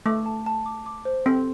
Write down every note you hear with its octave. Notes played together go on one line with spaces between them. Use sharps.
A3 D6
A5
A5
D6
D6
C5
C4 A4